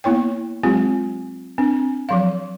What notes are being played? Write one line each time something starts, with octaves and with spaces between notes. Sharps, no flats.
A#3 B3 E4 C#5 G5
F#3 G#3 C4 F4 G4
C4 D4
F3 F#3 F5